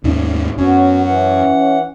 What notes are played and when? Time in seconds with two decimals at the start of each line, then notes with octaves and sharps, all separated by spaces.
0.04 D#2 G#2 C#4
0.58 F#2 B3 C#4 F#4
1.03 E3 F#5